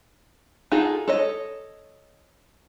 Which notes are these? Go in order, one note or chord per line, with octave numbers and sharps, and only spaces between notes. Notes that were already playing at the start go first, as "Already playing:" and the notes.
D#4 F4 F#4 G#4 A4
A4 C#5 D#5